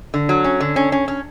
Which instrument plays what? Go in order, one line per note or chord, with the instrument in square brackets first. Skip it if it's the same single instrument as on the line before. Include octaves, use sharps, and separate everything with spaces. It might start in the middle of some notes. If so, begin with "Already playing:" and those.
[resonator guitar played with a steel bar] D3
F#3
C#4
D3
C#4
C#4
C#4